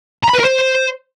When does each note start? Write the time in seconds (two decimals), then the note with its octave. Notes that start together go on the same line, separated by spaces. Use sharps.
0.23 A#5
0.28 B5
0.33 B4
0.39 A#4
0.44 C5